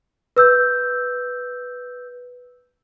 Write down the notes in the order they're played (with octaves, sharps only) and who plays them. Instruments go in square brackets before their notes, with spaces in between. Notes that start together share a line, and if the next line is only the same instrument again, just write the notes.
[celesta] B4 E6 G6